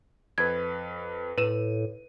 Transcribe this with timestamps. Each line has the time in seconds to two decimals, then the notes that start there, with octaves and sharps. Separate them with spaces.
0.38 F2 B4 G#6
1.38 A2 B4 D#7 E7